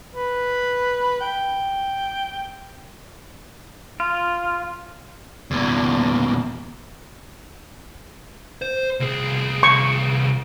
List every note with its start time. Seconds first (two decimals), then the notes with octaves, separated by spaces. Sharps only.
0.15 B4
1.21 G5
4.00 F4
5.51 E2 A#2
8.62 C5
9.00 C2 G#4
9.63 C#6